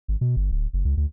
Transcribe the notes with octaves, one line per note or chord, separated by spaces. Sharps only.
G#1
B2
G1
D1
F#1
C#2
D2